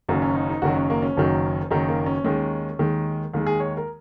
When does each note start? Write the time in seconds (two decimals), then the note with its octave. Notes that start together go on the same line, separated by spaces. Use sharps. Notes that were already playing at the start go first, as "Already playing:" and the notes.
0.09 F#1 F#2 D#3 F#3
0.22 C#4
0.35 D#4
0.49 D#4
0.62 F#1 F#2 D#3 F#3 F#4
0.76 C#4
0.90 A#3
1.02 C#4
1.17 F#1 F#2 D#3 F#3
1.70 F#1 F#2 D#3 F#3 D#4
1.89 A#3
2.06 C#4
2.24 D#2 D#3 G#3 C#4
2.79 D#2 D#3 G#3
3.34 D#2 D#3 G#3
3.46 G#4
3.60 C#5
3.77 A#4